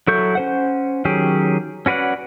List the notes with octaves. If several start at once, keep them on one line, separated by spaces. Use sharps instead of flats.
F#3 E4 A4 C#6 G6
C#4 C5 F#5
D#3 F#3 C#4 G4 G#4
C#4 F#4 B4 D5 F#5